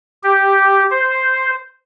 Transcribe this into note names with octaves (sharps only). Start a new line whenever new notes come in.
G4
C5